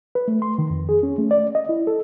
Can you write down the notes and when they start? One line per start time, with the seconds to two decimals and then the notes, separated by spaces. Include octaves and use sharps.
0.15 B4
0.28 A3
0.42 C6
0.58 D#3
0.70 F2
0.89 G#4
1.03 C#4
1.18 A3
1.31 D5
1.55 D#5
1.69 E4
1.87 A4